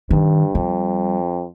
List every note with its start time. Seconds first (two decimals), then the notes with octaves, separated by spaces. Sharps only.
0.11 G2 D#3
0.55 F2 G3